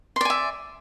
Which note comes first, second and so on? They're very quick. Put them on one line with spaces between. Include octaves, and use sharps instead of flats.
C6 D5 G#5 E5